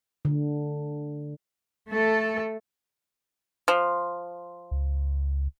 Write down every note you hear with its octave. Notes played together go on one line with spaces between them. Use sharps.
D3
A3 A4
F3
C#2